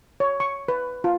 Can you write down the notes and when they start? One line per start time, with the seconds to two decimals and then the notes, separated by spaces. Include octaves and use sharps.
0.20 C#5
0.40 C#6
0.68 B4
1.04 F4